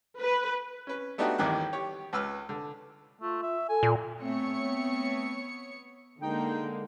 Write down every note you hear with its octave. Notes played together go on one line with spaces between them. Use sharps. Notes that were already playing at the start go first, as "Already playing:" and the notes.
B4
C#4 B4
A3 B3 D4 D#4 F#4 G4
A1 D#2 A2 D#3 G3 F#6
G4 C#5
C#2 B4 E6 F6
D3
A3 F4
E5
A4 G#5
A#2
A3 B3 C4 C#5 C#7
D3 G#3 A#3 D#4 G5